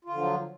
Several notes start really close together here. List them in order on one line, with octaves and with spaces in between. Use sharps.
F4 D3 F3 F#3